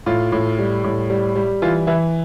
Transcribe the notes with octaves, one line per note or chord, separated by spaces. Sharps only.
A2 F4
A2
G3
A2
G3
G3
E3 F4
E3 E4